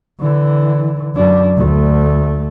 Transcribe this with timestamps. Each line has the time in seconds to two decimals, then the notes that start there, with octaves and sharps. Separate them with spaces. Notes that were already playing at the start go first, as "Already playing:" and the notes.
0.20 D3 E3
1.15 F#2 D4
1.57 D2 A3